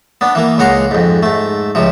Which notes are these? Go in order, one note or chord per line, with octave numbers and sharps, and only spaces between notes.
B3 D4
E3 A#3
C#2 G#3 F#5 A#5 C6
F2 G#2
G#2 A3
C#2 C3 F3